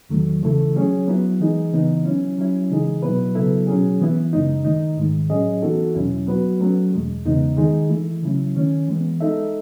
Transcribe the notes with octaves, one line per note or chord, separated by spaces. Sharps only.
E2 D#3 F#3 A3
C#3 E3 A3 E4 A4
F#3 C#4 G#4 C#5
F#3 B3 E4
E3 G#3 D#4 G#4
C#3 E3 B3 D#4
F#3 C#4 E4
F#3 C#4 E4
C#3 E3 G#3 D#4 G#4
B2 F#3 B3 E4 B4
C#3 F#3 B3 E4 A4
B2 F#3 C#4 G#4
E3 B3 E4
F#2 C#3 G#3 D#4
D#3 A3 D#4
G#2 D#3 G#3
A2 F#3 C#4 G#4 D#5
E3 B3 D#4 F#4 A4
E2 B2 F#3 C#4 E4
F#3 B3 F#4 B4
F#3 A3 C#4
E2 B2 G#3
E2 C#3 G#3 B3 D#4
D#3 G#3 D#4 G#4
E3 A3 E4
C#3 F#3 C#4 E4
D#3 A3 C#4
E3 G#3 B3
G#3 D#4 A4 E5